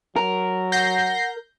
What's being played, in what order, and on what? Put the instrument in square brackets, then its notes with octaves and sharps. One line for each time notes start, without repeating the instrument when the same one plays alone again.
[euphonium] F#3 [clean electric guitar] A#4
[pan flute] F#5 [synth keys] G6 A#6 C7